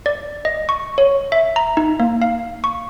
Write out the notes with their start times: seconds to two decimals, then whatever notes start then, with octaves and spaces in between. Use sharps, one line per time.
0.06 D5
0.45 D#5
0.69 C#6
0.98 C#5
1.32 E5
1.56 A#5
1.77 D#4
2.00 A#3
2.22 F5
2.64 C#6